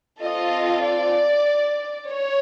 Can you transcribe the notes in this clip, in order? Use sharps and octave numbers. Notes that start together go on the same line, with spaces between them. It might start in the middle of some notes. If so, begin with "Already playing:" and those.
C4 F4 A4 D#5
D5
C#5